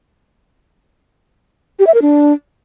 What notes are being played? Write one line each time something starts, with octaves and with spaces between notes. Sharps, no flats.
G4
E5
A#4
D4